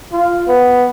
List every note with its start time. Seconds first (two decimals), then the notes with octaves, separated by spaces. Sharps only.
0.12 F4
0.48 B3